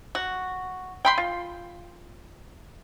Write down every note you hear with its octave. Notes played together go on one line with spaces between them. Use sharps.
F#4
G5 B5 C6
F4